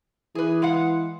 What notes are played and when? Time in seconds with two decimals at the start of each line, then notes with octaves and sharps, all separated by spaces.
0.35 E3 G#4 B4
0.62 G#3 F5 F#5